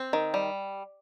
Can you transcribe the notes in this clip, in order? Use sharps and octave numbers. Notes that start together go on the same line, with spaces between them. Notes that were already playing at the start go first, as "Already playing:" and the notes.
Already playing: C4
D#3
G3